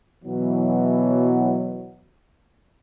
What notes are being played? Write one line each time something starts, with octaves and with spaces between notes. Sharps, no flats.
B2 E3 F#3